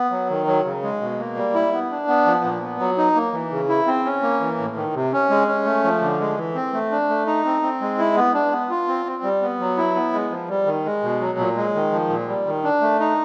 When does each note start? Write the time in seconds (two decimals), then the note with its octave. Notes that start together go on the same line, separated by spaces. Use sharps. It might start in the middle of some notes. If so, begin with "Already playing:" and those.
Already playing: B3
0.11 F#3
0.29 D#3
0.47 F#3
0.65 C#3
0.82 G#3
1.01 B2
1.19 A#3
1.36 G3
1.54 E4
1.73 B3
1.91 D4
2.08 B3
2.26 F3
2.44 A#2
2.61 B3
2.80 F#3
2.98 D#4
3.15 A#3
3.32 E3
3.51 C#3
3.69 E4
3.87 C4
4.05 C#4
4.22 A#3
4.40 E3
4.59 A2
4.76 D#3
4.94 C3
5.13 C#4
5.30 G#3
5.48 C#4
5.65 A3
5.84 F3
6.01 D3
6.20 G#3
6.37 E3
6.55 C4
6.74 A3
6.91 D4
7.09 A3
7.27 D#4
7.45 C4
7.62 C4
7.81 G#3
7.98 E4
8.16 B3
8.34 D4
8.51 B3
8.70 F4
8.88 C4
9.05 C4
9.23 G3
9.42 B3
9.60 F#3
9.77 E4
9.95 B3
10.13 G#3
10.30 F3
10.49 G3
10.66 D#3
10.85 G#3
11.03 B2
11.21 F#3
11.38 A#2
11.57 G#3
11.75 D#3
11.92 F3
12.09 A#2
12.28 G3
12.46 D#3
12.64 D4
12.81 A3
13.00 D#4